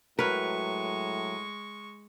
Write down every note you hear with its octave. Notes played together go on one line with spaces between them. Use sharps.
A2 F#3 G#3 A#4 B4 C#6